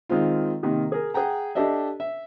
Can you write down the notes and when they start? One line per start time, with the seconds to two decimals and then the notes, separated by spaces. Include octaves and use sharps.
0.10 D#3 G#3 C4 F4
0.63 C3 D#3 A#3
0.92 G#4 A#4
1.14 G#4 F#5 G5 A#5
1.55 D4 G4 A4 D#5 E5
2.00 E5